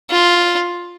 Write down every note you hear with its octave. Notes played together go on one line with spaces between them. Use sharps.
F4